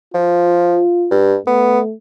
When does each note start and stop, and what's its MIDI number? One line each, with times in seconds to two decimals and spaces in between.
0.14 0.79 53
0.14 1.16 65
1.11 1.36 43
1.47 1.93 57
1.47 1.80 59